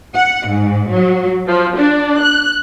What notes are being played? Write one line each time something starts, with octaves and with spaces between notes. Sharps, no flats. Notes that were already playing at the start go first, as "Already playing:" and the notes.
F#5
G#2
F#3
F3
D4
F#6